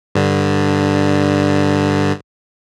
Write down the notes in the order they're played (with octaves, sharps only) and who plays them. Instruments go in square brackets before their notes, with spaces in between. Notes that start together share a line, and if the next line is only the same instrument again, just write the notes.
[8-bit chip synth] G2 D3